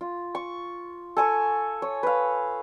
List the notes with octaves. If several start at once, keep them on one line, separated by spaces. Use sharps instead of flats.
F4
C#6
A4 G#5 C#6
C#5
B4 F5